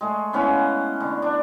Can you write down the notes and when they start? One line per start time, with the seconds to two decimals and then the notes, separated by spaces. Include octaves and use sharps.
0.01 G#3 A3
0.33 B3 C#4 E4 F5
1.00 D3
1.22 D4